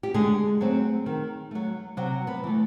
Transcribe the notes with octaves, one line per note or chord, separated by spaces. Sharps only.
G4
D3 G#3 G#4
F#3 A3 C4
D#3
F#3 A3
C3 F#3 F#4
B3 B4
E3 A3